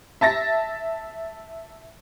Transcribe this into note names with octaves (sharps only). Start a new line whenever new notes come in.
E5 A5 A6 A#6